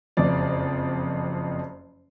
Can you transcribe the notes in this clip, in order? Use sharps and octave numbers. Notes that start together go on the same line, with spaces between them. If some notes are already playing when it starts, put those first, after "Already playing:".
F#1 F2 D5